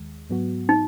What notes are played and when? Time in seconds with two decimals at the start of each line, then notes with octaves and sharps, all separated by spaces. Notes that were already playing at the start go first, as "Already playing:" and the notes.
Already playing: D#2 D#3 G#3
0.30 G#2 F#3 B3 F#4
0.69 D#4